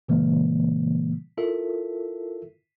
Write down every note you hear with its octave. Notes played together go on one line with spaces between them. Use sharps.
A#2 C#3 E3 G3 G#3 A#3
E4 F4 A4 A#4 E5